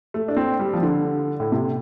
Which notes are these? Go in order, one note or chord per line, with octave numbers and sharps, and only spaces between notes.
A3
D4
C4
G3
F3
D3
A2
C3